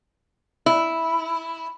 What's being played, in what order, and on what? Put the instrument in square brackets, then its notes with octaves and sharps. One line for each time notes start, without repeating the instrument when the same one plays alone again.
[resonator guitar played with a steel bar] E4